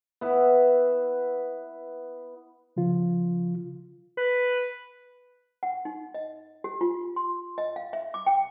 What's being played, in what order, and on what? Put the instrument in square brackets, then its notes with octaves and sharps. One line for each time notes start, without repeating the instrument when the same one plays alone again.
[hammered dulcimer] B3 E4 B4
[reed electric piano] C#3 F3 F4
[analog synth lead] B4
[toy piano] F#5
D#4
D#5
G4
F4
C6
D#5
F5
E5
D6
G5